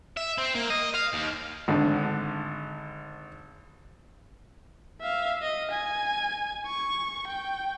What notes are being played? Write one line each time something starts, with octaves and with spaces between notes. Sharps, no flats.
E5
C4
A#3
D#5
F5
D#2
G#1 D3
E5 F5
D#5
G#5
C#6
G5